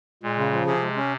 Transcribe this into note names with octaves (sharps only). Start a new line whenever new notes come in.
A#2 G#3
C#3
F3
C3 G#4
G#3
C#4